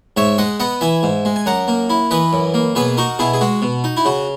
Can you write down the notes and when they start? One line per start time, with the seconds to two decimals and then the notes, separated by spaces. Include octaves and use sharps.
0.17 G#2 C#5 E5
0.38 G#3 D#5 F#5
0.60 B3 D#5 F#5
0.81 E3 E5 G#5
1.03 G#2
1.25 G#3
1.36 G#5
1.46 F#2 F#5 A#5
1.68 A#3
1.90 E4
2.11 E3 B4 D#5
2.33 F#2
2.54 A#3
2.75 B2 G#4 B4
2.97 D#4 F#4 A#4
3.19 B2 E4 G#4
3.33 G#4
3.41 G#3 F#4
3.62 B2
3.84 D#4
3.97 E4
4.05 C#3 F#4